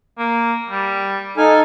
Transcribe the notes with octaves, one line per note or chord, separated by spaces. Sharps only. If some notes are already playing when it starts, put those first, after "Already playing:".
A#3
G3
D#4 A4 F5 G#5